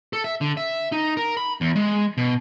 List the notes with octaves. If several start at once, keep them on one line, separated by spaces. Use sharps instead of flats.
A4
E5
D3
E5
D#4
A#4
B5
E2
G#3
B2